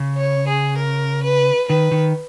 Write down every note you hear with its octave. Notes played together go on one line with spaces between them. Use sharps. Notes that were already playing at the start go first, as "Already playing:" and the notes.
Already playing: C#3
C#5
G#4
A#4
B4
D#3 B4
D#3